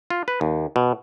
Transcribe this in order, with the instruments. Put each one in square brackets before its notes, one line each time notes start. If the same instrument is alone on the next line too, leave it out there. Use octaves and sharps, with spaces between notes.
[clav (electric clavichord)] F4
B4
D#2
B2